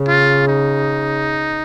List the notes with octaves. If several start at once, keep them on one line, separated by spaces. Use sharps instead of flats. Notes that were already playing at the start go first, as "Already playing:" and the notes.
Already playing: C#3
F4
D#4